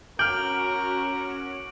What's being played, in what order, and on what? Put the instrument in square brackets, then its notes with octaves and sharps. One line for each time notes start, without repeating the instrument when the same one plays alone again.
[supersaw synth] C#4 F#4 [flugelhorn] A#4 [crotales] D6 D7 F#7 [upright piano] F6 G6